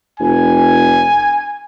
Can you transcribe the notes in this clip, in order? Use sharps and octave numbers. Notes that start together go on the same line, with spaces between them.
F1 G#5